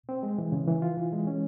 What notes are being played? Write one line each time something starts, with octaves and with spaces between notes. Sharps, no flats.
C4
G#3
E3
C#3
E3
F4
E3
G#3
C#4